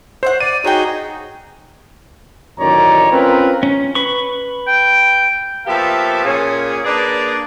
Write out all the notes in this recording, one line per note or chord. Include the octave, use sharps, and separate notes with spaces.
C5 C#5 E5 F#5
D5 D#7
D#4 F#4 G#4 C#5 G5
A1 F#2 D#3 C#5 D5 A#5
C4 C#4 F4 A#4 B4
C#4
B4 C#6
G5
F3 A#3 B3 G4 A4 E5
A#2 C#4 G#4
A#3 D4 G#4 B4 D5